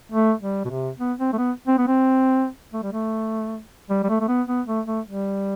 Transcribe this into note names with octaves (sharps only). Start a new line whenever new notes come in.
A3
G3
B2
C3
B3
C4
A3
B3
C4
B3
C4
A3
G3
A3
G3
G3
A3
A3
B3
B3
A3
A3
G3